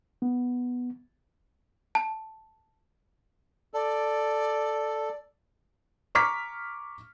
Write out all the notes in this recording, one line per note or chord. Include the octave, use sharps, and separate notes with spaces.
B3
A5
A4 D5
A#5 C#6 D6 F6 B6